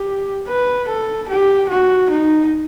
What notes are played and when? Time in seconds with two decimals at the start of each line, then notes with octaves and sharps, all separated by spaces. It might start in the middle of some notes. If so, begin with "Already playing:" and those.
Already playing: G4
0.48 B4
0.89 A4
1.29 G4
1.70 F#4
2.10 D#4